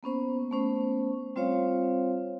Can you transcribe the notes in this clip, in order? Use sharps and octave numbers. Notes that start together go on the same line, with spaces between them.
A#3 B3 C#4 C5
A3 B3 C#4 C5
G3 C4 F4 C5 C#5 F5